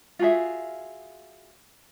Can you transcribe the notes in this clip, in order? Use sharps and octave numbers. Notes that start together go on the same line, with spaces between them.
F4 F#4 G#4 E5